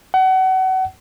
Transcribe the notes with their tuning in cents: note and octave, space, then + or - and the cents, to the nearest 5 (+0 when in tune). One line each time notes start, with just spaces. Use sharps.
F#5 +30